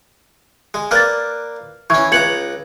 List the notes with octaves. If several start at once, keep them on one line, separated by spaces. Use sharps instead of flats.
G#3
A#3 B4 D5 F6 A6
E3 C#4 C#6 G#6
C#2 B4 A#5 G#6 C#7 F#7